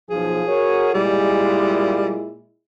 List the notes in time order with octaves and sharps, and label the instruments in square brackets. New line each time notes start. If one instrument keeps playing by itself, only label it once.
[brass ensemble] B1 F3 [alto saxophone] G#4
[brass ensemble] F#4 A#4 C#5
[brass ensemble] A#2 G#3 E4 [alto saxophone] G3